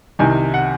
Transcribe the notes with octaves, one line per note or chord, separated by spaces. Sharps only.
C2 C3 D#3 G#5
F#5